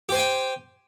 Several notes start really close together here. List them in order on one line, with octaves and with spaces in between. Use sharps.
G4 C5 G#5 G5